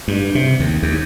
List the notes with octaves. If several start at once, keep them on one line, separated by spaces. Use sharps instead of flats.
G2
C3
D#2
D#2